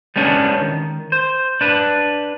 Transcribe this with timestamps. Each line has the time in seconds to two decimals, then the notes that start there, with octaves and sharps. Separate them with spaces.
0.16 G3 G#3 B3 C#4 D4
0.61 D#3
1.12 C5
1.61 D4 B4